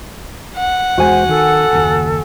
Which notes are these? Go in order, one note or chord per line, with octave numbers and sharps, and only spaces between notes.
F#5
E2 G3 G#3 F#4 C5 G#5
D#3 A4
F#1 D#2